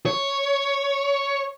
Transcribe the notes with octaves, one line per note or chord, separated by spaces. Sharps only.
C#5